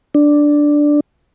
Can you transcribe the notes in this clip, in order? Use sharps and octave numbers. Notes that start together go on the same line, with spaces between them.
D4